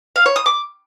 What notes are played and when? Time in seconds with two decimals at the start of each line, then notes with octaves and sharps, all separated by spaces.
0.16 F5
0.26 C#5
0.36 D#6
0.46 D6